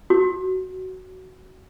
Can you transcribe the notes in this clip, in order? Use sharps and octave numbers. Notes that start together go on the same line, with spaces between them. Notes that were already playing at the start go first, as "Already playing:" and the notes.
F#4